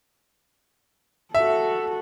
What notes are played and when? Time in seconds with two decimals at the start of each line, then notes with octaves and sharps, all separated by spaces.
1.35 F#4 A4 E5